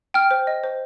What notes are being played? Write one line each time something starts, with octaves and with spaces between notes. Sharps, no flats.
G5 F6
C5
D#5
C5